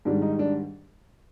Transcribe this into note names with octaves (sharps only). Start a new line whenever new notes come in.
G#2 D#3 G3 D4
D#4
D4